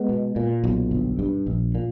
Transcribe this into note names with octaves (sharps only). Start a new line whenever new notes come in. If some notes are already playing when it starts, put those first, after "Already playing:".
Already playing: G#3 B3
B2
A#2
B1
G1
G2
A#1
A#2